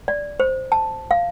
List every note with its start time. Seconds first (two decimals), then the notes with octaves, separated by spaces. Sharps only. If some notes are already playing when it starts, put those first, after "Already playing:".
0.08 D5
0.40 C5
0.72 A5
1.11 F5